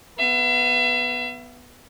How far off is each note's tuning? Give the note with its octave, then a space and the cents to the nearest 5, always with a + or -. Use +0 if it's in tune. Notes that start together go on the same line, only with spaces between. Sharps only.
B3 +0 E5 +40